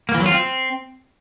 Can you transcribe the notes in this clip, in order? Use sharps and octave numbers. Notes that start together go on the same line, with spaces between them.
A#3
E3
F#3
F4
C4